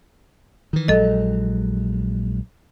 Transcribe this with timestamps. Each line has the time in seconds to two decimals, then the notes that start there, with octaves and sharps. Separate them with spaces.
0.73 D#3 E3
0.88 A#1 F#3 G#3 A4 D#5